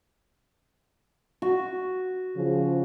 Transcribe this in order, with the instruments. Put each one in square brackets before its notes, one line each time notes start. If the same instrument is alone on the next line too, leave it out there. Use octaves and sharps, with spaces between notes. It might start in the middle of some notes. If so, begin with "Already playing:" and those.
[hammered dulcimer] F#4
[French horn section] C#3 F3